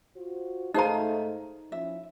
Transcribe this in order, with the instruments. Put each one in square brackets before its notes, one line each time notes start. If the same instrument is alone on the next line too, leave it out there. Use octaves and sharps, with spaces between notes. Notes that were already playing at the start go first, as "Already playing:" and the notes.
[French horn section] F4 F#4 C5
[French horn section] G#2 A3 D#5 [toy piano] D#4 A#5 [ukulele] G#4 C5 F5
[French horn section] F3 C#4 E4 [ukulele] E5